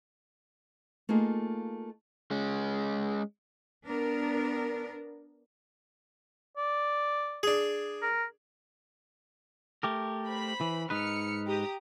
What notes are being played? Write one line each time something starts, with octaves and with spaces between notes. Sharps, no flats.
A3 A#3 D#4 F4 G#4
G#3 C#4
B3 D4 A#4
D5
D4 G#4
A#4
A3 G4 A#4
C5 B5
E3
G#2 D#4 B4 F6 C#7
G4 A#5 D#6